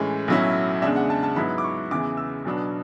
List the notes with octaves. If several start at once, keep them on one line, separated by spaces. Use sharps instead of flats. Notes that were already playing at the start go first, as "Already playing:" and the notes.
Already playing: A2 E3 G#3 C#4
B1 A2 F#3 C#4 E4
E2 C#3 G#3 D4 E5
F#5
A5
A5
G#2 F#3 B3 E4 B5
D6
C#6
E2 C#3 E3 D6
E6
B1 B2 F#3 B3 D4